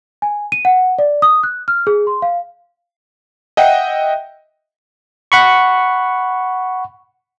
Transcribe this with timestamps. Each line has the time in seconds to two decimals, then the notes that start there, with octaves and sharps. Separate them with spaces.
0.22 G#5
0.52 D#7
0.65 F#5
0.99 D5
1.22 D#6
1.43 F#6
1.68 F6
1.87 G#4
2.07 C6
2.22 F5
3.57 D#5 E5 F#5 G5
5.32 F#5 B5 C#6